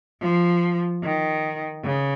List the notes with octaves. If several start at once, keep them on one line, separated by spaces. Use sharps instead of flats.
F3
D#3
C#3